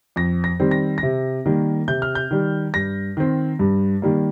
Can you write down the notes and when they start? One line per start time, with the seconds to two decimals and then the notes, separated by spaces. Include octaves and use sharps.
0.16 F2 A#6
0.44 A#6
0.60 D#3 G3 C4
0.71 A#6
0.98 A#6
1.03 C3
1.46 D#3 G3 A#3
1.88 C3 G6
2.02 F6
2.15 G6
2.31 D#3 G3
2.74 G2 A#6
3.17 D#3 C4
3.59 G2
4.02 D#3 G3 A#3